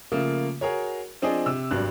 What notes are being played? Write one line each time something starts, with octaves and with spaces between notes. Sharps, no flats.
C#3 F3 A3 A#3
F#4 G#4 A#4 C#5
F3 C4 D4 G#4 D#5
C3 E6
G#1 G2 F#3 D4 F#6